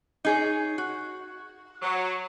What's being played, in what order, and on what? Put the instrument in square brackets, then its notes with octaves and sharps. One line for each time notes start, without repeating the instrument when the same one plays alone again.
[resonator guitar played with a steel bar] D#4 G#4 C#5
F#4
[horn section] F#3